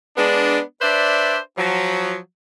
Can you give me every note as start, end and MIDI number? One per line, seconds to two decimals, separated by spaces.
0.17 0.59 56
0.17 0.59 59
0.17 0.59 62
0.81 1.37 62
0.81 1.37 71
0.81 1.37 72
0.81 1.37 74
0.81 1.37 76
1.57 2.17 53
1.57 2.17 54